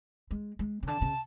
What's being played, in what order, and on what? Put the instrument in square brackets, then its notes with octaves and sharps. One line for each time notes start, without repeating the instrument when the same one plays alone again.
[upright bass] G#3
G#3
C#3
[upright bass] D3 [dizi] A5
[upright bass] C#3